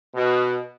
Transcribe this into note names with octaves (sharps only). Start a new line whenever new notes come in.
B2